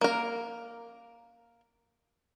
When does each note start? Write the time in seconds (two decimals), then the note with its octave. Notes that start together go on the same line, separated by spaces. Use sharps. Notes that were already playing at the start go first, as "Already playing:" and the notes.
0.01 A#3 A#4